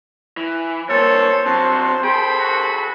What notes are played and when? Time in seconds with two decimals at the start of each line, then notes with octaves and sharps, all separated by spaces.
0.37 E3
0.89 G2 A#3 A4 C5 C#5
1.46 F#3 C4 F#4 A5
2.04 G#4 A4 C5 G5 B5
2.39 F#4